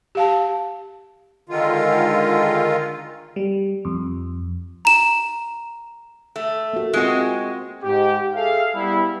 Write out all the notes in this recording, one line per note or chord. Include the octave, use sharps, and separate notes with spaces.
G4 F5 A5
D3 D#3 G#3 F4
G3
F2
A#5 E7
A3
A#3 F#4
G#3 C4 F4 F#4
G#2 G4
G#4 A4 E5 F5
G3 B3 E4